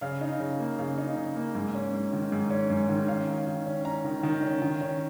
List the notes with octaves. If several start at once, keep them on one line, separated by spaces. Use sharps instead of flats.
C#3 F5
D#4
C#3
A#3
C#3 F5
D#4
C#3
A#3
G#2
C#4
G#2
D#3
G#2
C#4
G#2
D#3
C#4 F5
D#3
D#3
C#4
C#4 A#5
D#3
D#3
C#4
D#3
C#4